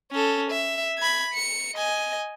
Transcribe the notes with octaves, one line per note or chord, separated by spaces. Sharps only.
C#4 A4
E5
B5 G#6
C#7
D#5 G#5